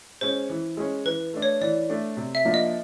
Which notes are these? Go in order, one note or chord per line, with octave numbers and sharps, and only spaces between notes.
G#3 C#4 C5
E3
G#3 C#4
E3 B4
A3 D4
C#5
E3 D5
A3 D4
C3
E5
F3 A#3 D4
D#5